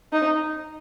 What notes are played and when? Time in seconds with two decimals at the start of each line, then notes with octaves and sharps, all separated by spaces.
0.12 D#4